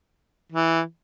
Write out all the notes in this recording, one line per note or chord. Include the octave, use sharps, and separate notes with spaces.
E3